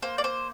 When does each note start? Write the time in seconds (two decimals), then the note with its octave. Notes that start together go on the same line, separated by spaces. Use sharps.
0.02 A#3 C5
0.18 D5
0.24 C5